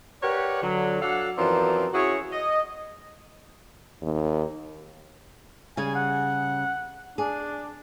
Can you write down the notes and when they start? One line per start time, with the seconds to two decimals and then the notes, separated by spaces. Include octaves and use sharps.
0.22 G4 A#4 B4 C#5 D5 F#5
0.62 D3 F#3
1.02 F#3 D4 A4 F5 F#5
1.38 F#2 E3 F3 C4 D5 A#5
1.94 C#4 E4 F#4 G#4 C#5
2.32 D#5
4.02 D#2
5.77 C#3 G3 G#4 G#5
5.95 F#5
7.18 D4 G#4